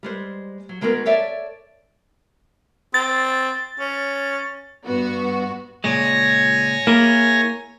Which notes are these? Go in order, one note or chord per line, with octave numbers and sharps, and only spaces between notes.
G3 G#3 C5
F#3
D#3 G#3 B3 F#4 A#4
A4 C#5 D5 E5
C4 A6
C#4
G2 B3 F#4
C#2 A#2 G#3 C#5 G#5 A#6
A#3 E4 G#4 A#4